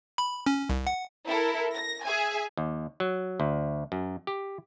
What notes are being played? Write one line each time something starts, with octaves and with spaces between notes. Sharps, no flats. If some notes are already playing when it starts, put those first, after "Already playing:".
B5
C#4
C2
F#5
E4 A4 A#4
A#6
G#4 E5 G#5
D#2
F#3
D2
F#2
G4